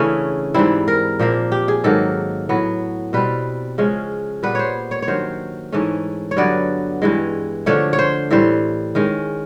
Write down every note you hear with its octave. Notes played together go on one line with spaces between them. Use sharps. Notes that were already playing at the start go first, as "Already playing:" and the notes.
Already playing: C#3 E3 A3 C#4 D4
G#2 E3 G3 C4 E4
A#4
A#2 F3 A#3
G4
G#4
G#2 D#3 F#3 A#3 A4
A2 F#3 B3
B2 G3 C4 B4
C#3 F3 G#3 C#4
A#2 G3 B3 B4
C5 C#5
C#5
C#5
G2 D#3 F#3 C5
G#2 E3 A3 C#4
C#5
G2 D3 F#3 B3 D5
G2 E3 G#3
D3 F3 A3 C#5
C#5
C5
A2 E3 G3 C5
D#3 G#3 C#4